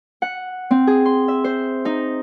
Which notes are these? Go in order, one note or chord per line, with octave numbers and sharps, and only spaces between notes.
F#5
C4
G#4
C6
E5
C5
D#4